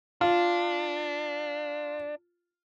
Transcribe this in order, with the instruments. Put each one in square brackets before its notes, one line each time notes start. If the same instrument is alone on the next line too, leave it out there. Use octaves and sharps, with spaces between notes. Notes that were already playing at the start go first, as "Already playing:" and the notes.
[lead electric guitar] D4 [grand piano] F4